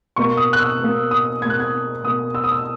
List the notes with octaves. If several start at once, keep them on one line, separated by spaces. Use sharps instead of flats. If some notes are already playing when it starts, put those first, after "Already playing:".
B2 A#3 C#6
D#6
F#6
E6
B2
A#3
D#6
B2 A#3 F#6 G#6
G#6
B2 A#3 D#6
E6
D#6
E6